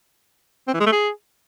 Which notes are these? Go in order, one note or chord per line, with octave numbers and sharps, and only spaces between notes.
C4
E3
G#3
A3
G#4